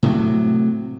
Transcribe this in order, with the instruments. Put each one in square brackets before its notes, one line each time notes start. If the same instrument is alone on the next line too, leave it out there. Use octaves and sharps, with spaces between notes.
[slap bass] A2 C3 F#3